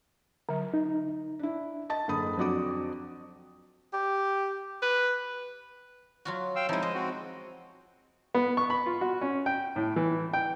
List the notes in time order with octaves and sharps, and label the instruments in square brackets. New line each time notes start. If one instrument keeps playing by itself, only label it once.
[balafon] D3 F#3
[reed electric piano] D#4
[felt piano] D4 E4
D#5 A5 A6
F#1 D3 B5 D#6
F2 F#3 D4 F#4 D6 D#6
[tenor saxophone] G4
B4
[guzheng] F#3 F4 F#4
[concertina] F5 G5 E6
[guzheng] F3 G#3 [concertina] C4 D#4 E4
[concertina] G#3 [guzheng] D#5
[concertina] C4 F#4
[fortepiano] B3
C#6
B5
F4
F#4
C#4
G5
A2
E3
G5